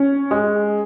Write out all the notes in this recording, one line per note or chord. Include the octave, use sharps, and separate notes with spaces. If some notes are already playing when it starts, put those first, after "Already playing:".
Already playing: C#4
G#3